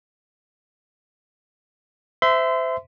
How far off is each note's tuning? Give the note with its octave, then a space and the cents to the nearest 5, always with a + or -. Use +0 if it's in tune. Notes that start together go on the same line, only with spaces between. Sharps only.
C5 -25 E5 +0 C6 -30